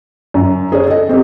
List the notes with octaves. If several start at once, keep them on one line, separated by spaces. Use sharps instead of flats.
F#2
G#4 C5 C#5
A4 D#5
C4 G4